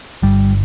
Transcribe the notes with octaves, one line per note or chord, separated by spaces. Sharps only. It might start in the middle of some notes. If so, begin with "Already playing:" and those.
G1 G3